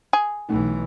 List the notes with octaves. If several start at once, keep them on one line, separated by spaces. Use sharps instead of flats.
G#4
B1 E3 A3 C#4 D#4